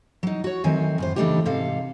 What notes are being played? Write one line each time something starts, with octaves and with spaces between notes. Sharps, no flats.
F#3 D#4
F#4 C#5
D#3 F#3 A3 C4 G#5
F#2 A2 C5
C#3 E3 A3 D4 D#4 G4
G#2 C3 A4 F5